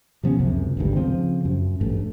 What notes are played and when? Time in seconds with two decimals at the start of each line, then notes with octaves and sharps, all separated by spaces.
0.23 C3 F3 B3 C#4
0.39 C#2 F#2 C3
0.77 G#1 D2 G2
0.96 C#3 F3 C4
1.45 F#2
1.81 A1 G2 A3